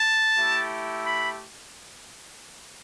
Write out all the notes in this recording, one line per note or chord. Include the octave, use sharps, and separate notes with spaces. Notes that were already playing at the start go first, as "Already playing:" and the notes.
Already playing: A5
A3 E4 G4
B5